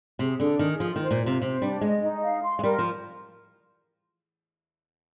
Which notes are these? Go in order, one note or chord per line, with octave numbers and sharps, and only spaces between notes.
C3 G#4
D3 D4
D#3 G#4
F3 F4
D#3 C5
A#2
F4
C3
C3 C5
G3 D4
G#3 D#5
D#4
F5
C6
G#3
G3 A#4
F3